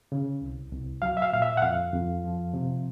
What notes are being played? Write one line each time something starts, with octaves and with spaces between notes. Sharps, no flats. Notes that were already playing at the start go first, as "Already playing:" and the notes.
C#3
C2
C2
F#3 F5
E5
F5
A#2 F5
E5
F#5
F2 F5
F2
F3
C3